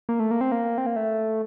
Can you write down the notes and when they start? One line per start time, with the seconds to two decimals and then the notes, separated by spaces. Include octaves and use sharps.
0.09 A#3
0.20 A3
0.31 A#3
0.41 C4
0.52 A#3
0.78 C4
0.86 A#3
0.96 A3